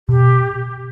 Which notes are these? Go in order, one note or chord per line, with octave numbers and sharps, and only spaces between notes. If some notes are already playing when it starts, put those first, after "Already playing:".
B2 G4